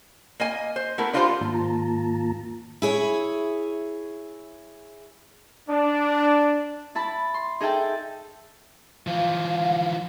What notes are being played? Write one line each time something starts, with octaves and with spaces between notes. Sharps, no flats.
A#3 D#5 G#5
C5
A3 B3 E4 A#4
D4 D#4 F4 G4 B4 C5
G#2 D#3 A#3 F4 A5 A#5
E4 G#4 C#5
D4
E4 A5 B5
C6
D#4 G#4 A4 E5 G5 A5
E3 F3 F5